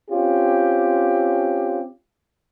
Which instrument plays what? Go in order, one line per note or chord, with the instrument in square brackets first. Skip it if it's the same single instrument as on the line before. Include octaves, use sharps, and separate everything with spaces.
[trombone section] C4 C#4 F4 G4